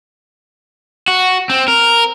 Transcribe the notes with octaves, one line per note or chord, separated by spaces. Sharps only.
F#4
C4
A#4